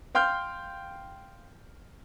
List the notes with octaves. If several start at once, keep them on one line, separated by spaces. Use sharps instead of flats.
F5 G5 C6 F6 G6